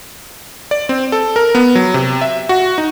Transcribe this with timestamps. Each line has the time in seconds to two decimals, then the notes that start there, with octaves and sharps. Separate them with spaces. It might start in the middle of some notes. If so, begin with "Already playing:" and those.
0.71 D5
0.89 C4
1.12 A4
1.36 A#4
1.55 B3
1.75 F#3
1.94 C3
2.21 E5
2.49 F#4
2.78 D#4